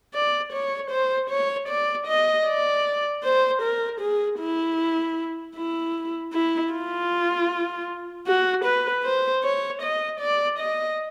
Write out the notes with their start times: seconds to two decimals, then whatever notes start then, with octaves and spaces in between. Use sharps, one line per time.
0.14 D5
0.53 C#5
0.91 C5
1.30 C#5
1.69 D5
2.07 D#5
2.47 D5
3.24 C5
3.62 A#4
4.01 G#4
4.40 E4
5.57 E4
6.33 E4
6.73 F4
8.27 F#4
8.65 B4
9.04 C5
9.44 C#5
9.82 D#5
10.20 D5
10.59 D#5